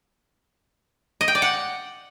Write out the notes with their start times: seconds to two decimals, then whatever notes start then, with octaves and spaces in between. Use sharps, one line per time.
1.21 D#5
1.28 G5
1.35 D5
1.42 F#5